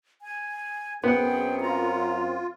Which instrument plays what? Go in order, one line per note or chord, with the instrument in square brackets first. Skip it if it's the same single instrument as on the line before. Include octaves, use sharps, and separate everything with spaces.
[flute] G#5
[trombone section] F#2 C4 [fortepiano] B3 F#5 [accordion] G#4 [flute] G5
[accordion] F4 [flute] A#5